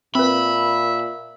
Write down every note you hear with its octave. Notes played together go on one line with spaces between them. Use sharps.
A#2 C4 B4 E5 B5